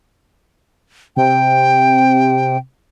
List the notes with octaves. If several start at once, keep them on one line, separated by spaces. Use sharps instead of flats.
C3 G5